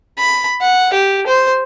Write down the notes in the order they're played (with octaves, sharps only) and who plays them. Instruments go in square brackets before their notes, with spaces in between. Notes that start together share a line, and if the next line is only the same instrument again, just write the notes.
[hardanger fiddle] B5
F#5
G4
C5